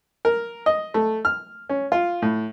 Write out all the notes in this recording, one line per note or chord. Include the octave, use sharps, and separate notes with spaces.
A#4
D#5
A3
F6
C#4
F4
A2